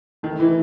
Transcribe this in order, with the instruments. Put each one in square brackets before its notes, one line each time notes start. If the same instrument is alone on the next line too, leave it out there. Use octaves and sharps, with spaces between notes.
[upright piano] D#3 [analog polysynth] A3
[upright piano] E3 [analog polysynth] E4